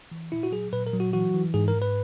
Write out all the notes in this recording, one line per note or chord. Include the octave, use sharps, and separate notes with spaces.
E3
A#2 E4
F#4
F#3 G#4
A#2 B4
A#4
F#3
F#4
E3 F#4
E3
G#2 G#4
A#4
G#2
B4